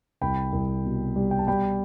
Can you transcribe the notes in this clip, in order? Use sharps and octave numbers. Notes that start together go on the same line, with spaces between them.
C2 G5 B5
C2
B2
G3
G5
A5
G3 G5 B5